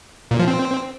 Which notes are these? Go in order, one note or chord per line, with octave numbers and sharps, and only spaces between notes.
A#2
F3
C4